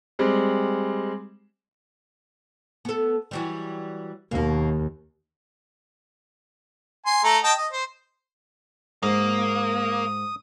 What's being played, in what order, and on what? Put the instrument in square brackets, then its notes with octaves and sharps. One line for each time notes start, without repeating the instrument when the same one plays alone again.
[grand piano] G3 G#3 C4
[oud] B3 A4
E3 F#3 G3
[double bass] D#2 [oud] B2 A#3
[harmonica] G#5 C6
A3 A4 A#5
D#5 G5 A5
D#5
C5
[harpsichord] G#2 [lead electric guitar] A#3 [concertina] D#6